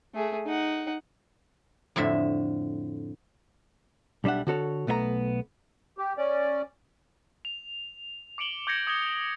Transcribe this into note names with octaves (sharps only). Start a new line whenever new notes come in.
A3 G#4
D#4 F#5
F2 A2 D3 E5
B1 G3 D4 E5 F#5
D3 F#4 A4 C#5
B1 A3 B3 E5 A#5
G4
C#4 D5
F7
D6 C#7 D7 F#7 G7
D6 G6 G#6 A#6 C#7
D#6 G#6 A#6 G7